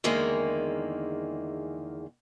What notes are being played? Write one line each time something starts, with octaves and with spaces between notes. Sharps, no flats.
E2 D3 D#3 G#3 A#3